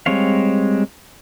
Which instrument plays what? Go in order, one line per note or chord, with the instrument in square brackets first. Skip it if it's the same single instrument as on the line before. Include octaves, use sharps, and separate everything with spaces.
[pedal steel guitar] G3 G#3 C4 C#5 F5